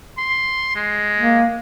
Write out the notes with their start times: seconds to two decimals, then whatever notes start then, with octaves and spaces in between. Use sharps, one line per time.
0.18 C6
0.75 G#3
1.17 A#3